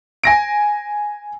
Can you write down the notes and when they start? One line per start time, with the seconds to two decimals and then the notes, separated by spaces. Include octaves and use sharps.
0.24 G#5 A#6 D7